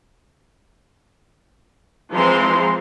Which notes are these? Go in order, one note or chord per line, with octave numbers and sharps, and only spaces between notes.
E3 F3 G#3 C4 A#5 C6